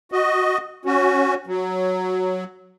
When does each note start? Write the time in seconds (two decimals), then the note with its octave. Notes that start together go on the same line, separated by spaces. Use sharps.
0.12 F#4 D#5
0.85 C#4 F#4
1.47 F#3